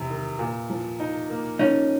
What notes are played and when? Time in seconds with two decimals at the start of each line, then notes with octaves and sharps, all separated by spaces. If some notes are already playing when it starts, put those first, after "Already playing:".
Already playing: E2 C3
0.10 D#3
0.39 A#2
0.70 F3
1.00 D#4
1.30 A#3
1.59 F3 C#4 D#4